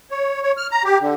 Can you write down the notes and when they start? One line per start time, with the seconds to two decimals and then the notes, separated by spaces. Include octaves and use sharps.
0.11 C#5
0.43 C#5
0.57 F6
0.71 A#5
0.84 G4
1.00 D3